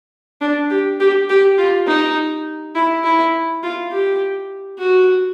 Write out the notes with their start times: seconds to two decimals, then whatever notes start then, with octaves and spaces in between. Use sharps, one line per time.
0.41 D4
0.70 G4
1.00 G4
1.30 G4
1.58 F4
1.87 D#4
2.75 E4
3.04 E4
3.63 F4
3.92 G4
4.79 F#4